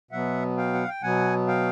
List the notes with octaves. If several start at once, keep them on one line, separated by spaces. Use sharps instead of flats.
B2 F#3 B3 E5 F#5
F5 G5
F#5
G5
B2 F#3 B3 F#5 G#5
F5 G5